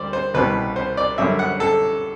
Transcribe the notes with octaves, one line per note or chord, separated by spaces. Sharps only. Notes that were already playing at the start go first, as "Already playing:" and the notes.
Already playing: D2 G3 C5 D5
C5
C2 B2 G3 B4
C5
D5
F#2 D3 G3 E5
F#5
A4